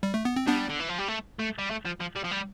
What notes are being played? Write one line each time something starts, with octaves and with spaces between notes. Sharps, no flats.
G3
A3
B3
C4
G3 B3 D4
D3
E3
F3
G3
A3
A3
G3
A3
F3
F3
G3
F3
G3